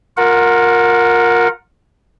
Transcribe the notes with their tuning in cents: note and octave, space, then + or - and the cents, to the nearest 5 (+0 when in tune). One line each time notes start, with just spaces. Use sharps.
F4 +25 A#4 +0 F#5 -20